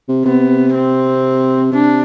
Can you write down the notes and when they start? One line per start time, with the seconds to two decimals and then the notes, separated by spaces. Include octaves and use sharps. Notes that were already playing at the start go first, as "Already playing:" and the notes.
0.09 C3
0.25 C3 B3
0.74 C4
1.72 C3 D4